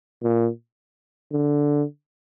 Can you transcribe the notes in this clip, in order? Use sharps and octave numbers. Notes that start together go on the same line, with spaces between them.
A#2
D3